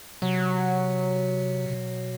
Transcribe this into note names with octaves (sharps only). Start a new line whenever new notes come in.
C3 F#3
B2